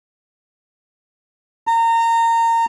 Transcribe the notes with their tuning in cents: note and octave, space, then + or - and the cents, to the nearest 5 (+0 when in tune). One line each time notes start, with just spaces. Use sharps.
A#5 -25